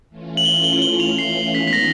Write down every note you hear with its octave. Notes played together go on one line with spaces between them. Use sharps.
E3 A3 C#4 F4
F#7
G7
G7
G7
F7
C7
D#3 G#3 B3 D#4 B6
B6
A#6